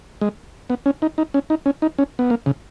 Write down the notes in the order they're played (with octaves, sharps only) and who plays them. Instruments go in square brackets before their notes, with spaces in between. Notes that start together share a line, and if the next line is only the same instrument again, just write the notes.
[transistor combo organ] G#3
B3
C#4
D#4
D#4
C#4
D#4
C#4
D#4
C#4
B3
A#3
C#3